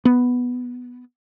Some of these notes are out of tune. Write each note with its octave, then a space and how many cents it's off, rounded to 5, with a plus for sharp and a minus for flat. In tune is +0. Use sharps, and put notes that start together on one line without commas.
B3 +0